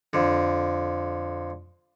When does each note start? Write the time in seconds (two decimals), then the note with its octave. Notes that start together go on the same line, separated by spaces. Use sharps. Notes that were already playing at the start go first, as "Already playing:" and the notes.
0.13 F2 D3